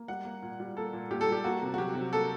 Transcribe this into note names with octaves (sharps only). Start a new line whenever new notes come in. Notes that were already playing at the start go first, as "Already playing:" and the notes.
Already playing: A#3
G3 F#5
A#3
A#2
G3
A#3 A4
A#2
A#2 G4
A4
G3 G4
A#3 F#4
C3
F#4
F#3 G4
C3
A#3 A4